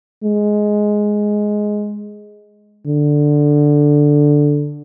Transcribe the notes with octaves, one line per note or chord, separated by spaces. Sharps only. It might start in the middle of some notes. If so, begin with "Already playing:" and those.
G#3
D3